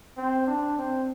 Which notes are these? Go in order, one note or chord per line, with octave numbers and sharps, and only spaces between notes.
C4
D4
C4